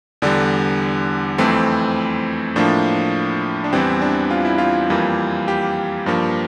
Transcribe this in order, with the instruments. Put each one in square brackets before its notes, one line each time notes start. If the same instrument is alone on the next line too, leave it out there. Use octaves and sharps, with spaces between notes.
[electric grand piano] E2 D3 G3 D4
F2 E3 A3 C4
A2 F3 A#3 D4
D4
E2 E3 G3 C4
D4
F4
E4
F4
F2 E3 G3 A#3
G4
G2 F3 A#3